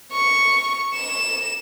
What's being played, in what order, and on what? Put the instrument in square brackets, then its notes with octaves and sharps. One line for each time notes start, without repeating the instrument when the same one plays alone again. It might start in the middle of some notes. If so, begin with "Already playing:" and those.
[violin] C#6
E7